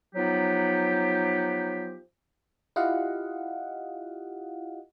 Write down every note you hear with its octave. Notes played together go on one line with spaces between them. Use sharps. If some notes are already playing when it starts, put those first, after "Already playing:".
F3 F#3 B3 D#4 G4
E4 F4 G4 D#5 F5 F#5